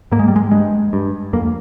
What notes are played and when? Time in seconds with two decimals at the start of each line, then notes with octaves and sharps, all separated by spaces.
0.12 G#2 A#3
0.19 G#3
0.28 G3
0.36 G#3
0.51 G2 G#3
0.93 G2
1.33 F2 A#3